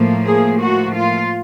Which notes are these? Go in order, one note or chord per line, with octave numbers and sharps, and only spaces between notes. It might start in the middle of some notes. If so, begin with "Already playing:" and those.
Already playing: A2 F3 A#3
G#4
F#4
F4